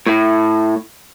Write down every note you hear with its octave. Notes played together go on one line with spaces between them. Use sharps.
A2